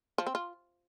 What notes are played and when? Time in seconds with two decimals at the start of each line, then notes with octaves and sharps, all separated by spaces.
0.18 F3
0.27 C4
0.35 F4